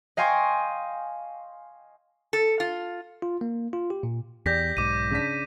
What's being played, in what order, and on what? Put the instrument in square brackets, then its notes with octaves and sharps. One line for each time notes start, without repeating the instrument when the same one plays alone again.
[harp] D#5 F5 G5 G#5 C6 C#6
[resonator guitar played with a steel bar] A4
F4
[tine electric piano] F4
A#3
F4
G4
A#2
[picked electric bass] E2 [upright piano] G4 D5 [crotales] G6 A#6 B6
[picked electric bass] B1 G#2 [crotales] D6 D#7
[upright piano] C#3 D4 B6